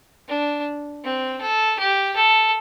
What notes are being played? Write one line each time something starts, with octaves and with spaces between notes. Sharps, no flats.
D4
C4
A4
G4
A4